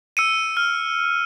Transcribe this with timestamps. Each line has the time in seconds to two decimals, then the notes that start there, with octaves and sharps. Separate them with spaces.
0.17 E6 C#7 D#7
0.57 F6